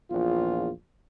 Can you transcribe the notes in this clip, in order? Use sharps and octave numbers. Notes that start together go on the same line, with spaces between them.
A#1 E2 F4